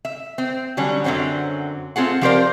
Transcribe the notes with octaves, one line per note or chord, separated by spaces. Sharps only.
E5
C4
D3 F#3 G3 C#4
F#2 D3 F#3 C4 C#4
A3 C4 F4 G#4 F#5
F3 C4 G4 A#4 C5 D5